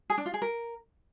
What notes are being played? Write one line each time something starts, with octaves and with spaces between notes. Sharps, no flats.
G#4
D4
F4
G#4
A#4